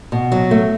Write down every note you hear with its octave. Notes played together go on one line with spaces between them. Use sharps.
B2
F#3
A3